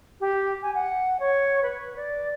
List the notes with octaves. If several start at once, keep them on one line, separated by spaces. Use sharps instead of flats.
G4
G#5
F#5
C#5
B4
D5